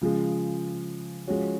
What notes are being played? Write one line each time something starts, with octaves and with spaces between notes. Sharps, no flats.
C#3 F3 G#3
F3 G#3 C#4 F#4 C#5